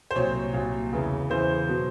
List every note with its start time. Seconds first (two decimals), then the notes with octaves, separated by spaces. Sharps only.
0.11 C5
0.15 C2 A#2 F#3 C#5
0.53 C2 A#2 F#3
0.93 E2 C#3 E3
1.30 E2 C#3 E3 C5
1.69 B2 F#3